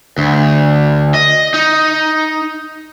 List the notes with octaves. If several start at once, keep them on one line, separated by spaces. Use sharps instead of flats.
D2
D#5
D#4